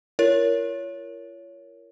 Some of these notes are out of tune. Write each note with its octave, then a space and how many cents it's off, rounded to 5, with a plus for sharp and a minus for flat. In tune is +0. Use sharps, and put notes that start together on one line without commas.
F4 -40 A#4 +0 C#5 +15